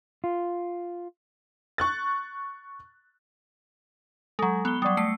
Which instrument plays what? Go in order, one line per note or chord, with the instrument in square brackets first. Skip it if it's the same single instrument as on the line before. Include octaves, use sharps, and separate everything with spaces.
[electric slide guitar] F4
[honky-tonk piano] C#6 F#6 A6
[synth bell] F#3 G#3 [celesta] A4 A#5
[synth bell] B3 G7
[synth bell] F#3 G3 [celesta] D5 D#6
[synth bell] A3 C7 C#7